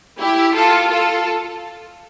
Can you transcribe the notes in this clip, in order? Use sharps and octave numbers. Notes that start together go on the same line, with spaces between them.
E4 G4
F4 A4
F4 A4